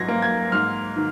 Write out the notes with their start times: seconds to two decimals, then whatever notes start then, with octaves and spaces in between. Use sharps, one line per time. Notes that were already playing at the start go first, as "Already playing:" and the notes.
Already playing: G#2 F#3 G#6 A#6
0.08 A#3
0.22 G#6
0.52 G#2 F6
0.96 D#3